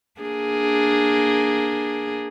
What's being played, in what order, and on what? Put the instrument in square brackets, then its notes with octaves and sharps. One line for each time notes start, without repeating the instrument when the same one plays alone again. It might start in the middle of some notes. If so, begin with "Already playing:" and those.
[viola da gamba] A#3 D4 G#4